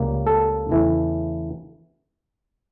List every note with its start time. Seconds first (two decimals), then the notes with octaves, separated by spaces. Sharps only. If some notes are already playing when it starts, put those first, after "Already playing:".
Already playing: C#2 C#3 G3 A#3
0.27 A4
0.69 E2 C#3 E3 A3